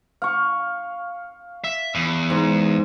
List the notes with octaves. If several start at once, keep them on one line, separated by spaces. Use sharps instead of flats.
F5 C#6
E5
E2
G#2